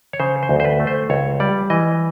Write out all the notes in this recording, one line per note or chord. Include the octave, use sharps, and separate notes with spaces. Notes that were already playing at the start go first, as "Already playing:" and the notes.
C#5
C#3 C5
C5
D2
C5
B4
A3
C5
C#2 C#5
G3 D5
E3 D#5